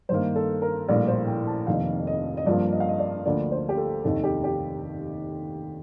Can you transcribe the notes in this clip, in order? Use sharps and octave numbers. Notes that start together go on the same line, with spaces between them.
G2 D#3 A#3 C5
A4
A#4
A#1 A2 G3 A#3 D5
C5
G5
A5
F1 F2 D#3 A#3 F5
D#5
D#5
G2 F3 A#3 D5
D#5
F5
D#5
D5
D2 D3 F3 A#3 D5
C5
G4
A4
F1 D#2 D#3 A4
G4
G4